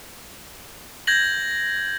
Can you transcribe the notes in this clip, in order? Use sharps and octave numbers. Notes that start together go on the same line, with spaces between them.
G6 G#6 A#6 F#7